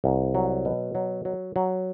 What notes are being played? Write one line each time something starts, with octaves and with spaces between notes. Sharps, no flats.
C2
F#3
B2
F#3
F#3
F#3